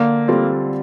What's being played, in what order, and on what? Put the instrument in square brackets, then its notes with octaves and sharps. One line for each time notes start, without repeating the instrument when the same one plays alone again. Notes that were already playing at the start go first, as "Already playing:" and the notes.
Already playing: [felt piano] D3 [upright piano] A#3
[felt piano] G3 C4 F4 A4